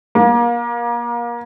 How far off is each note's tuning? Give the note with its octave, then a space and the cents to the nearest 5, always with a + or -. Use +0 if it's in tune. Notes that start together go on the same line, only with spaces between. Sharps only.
A#3 +30